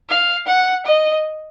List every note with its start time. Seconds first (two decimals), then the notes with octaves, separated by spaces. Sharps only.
0.09 F5
0.47 F#5
0.86 D#5